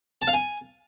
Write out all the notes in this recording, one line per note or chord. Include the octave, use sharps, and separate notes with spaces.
A5
F5
G#5